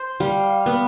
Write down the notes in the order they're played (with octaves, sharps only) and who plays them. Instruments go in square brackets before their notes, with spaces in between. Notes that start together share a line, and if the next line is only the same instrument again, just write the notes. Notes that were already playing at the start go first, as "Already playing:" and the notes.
Already playing: [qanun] C5
[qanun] G3 [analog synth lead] F5
[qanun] B3